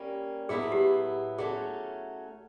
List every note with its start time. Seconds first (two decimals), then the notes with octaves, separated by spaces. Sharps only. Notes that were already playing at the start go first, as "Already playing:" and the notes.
Already playing: G3 A#3 C#4
0.49 A2 F#3 B3 E4 G#4
0.72 G4
1.38 F#3 A3 C#4 G#4